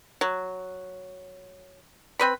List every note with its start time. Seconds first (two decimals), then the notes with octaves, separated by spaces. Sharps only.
0.21 F#3
2.20 C4 B4 B5